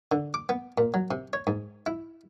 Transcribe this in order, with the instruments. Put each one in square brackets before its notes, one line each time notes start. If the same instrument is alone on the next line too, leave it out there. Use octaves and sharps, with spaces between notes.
[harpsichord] D3
D6
B3
A#2
F#3
C3
C#5
G#2
E4